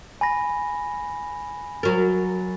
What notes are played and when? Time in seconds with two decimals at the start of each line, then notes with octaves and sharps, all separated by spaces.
0.21 G#5 B5 A#6
1.83 F#3 A#4 A6